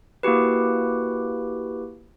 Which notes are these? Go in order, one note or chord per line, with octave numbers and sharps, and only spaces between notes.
A#3 E4 F#4 G4 B4